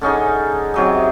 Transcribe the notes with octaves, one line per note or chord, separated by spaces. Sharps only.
D3 C#4 D#4 G#4
C3 F#3 D#4